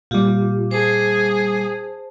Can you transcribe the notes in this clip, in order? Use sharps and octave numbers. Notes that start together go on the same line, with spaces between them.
A#2 G3 F4 G4
G#4 C5 A5